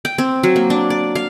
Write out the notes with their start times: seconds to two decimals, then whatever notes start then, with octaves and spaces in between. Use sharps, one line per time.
0.05 G5
0.18 C4
0.43 F#3
0.56 A#3
0.70 D4
0.90 D5
1.15 F5